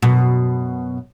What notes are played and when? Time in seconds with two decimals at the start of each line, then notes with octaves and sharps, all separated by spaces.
0.02 F#2 B2